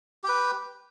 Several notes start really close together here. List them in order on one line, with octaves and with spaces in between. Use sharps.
G4 G5 B4